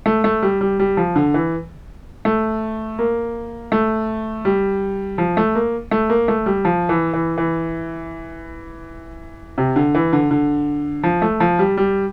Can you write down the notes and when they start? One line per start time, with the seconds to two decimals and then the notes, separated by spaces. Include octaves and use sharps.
0.06 A3
0.24 A3
0.42 G3
0.61 G3
0.79 G3
0.97 F3
1.16 D3
1.34 E3
2.25 A3
2.99 A#3
3.72 A3
4.45 G3
5.18 F3
5.37 A3
5.55 A#3
5.91 A3
6.10 A#3
6.28 A3
6.46 G3
6.65 F3
6.89 E3
7.13 E3
7.38 E3
9.58 C3
9.76 D3
9.95 E3
10.13 D3
10.31 D3
11.03 F3
11.22 A3
11.40 F3
11.59 G3
11.77 G3